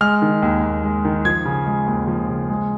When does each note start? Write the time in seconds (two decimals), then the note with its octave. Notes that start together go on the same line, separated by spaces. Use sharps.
0.01 G#3 F6
0.22 D#3
0.42 D#2
0.63 D#2
0.84 G#3
1.05 D#3
1.25 F3 G#6
1.45 C#3
1.66 G#3
1.87 D#2
2.08 F3
2.28 C#3
2.49 G#3